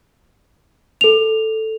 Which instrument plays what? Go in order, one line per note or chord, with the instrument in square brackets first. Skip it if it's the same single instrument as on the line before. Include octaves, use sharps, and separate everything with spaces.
[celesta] A4 F7